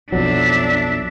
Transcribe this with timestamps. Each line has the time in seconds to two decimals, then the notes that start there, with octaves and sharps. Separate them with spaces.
0.12 B1 F2 F#3 D4 E5